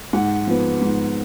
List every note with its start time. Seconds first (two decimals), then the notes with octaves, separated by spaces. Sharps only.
0.13 G#2 F#5
0.47 F3 B3
0.81 G#2